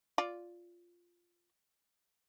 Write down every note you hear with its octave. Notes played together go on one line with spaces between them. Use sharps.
F4 D5